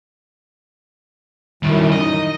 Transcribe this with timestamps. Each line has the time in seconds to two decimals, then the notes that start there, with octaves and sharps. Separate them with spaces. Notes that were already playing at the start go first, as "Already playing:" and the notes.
1.63 F#2 D#3 E3 G3
1.92 D#4 D#5